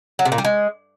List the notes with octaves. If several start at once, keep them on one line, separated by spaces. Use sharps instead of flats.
F#3
C3
A#2
G3
G#3